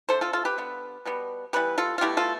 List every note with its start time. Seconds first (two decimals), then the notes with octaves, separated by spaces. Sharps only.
0.09 D3 A3 A4 C5
0.21 F4 A4
0.33 F4 A4
0.45 G4 B4
0.58 D3 G3 B3
1.05 B2 G3 B3
1.53 E3 G3 B3 G4 B4
1.78 F4 A4
1.98 F4
2.01 B2 A3 E4 G4
2.17 F4 A4